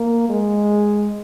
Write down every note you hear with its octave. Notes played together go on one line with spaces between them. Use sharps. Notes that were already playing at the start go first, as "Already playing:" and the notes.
Already playing: A#3
G#3